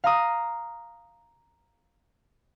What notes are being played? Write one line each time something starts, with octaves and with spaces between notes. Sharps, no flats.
F5 A#5 D#6